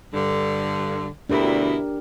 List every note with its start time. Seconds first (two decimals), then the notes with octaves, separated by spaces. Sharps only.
0.13 G2 D3
1.30 D2 B2 D4 E4 G4 A#4